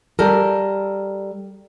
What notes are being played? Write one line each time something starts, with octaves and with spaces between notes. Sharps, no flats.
G3 A4 A#4